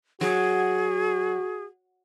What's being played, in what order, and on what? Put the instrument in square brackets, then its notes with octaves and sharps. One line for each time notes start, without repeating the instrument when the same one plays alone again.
[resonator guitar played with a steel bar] F#3 [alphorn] F#4 [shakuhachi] G#4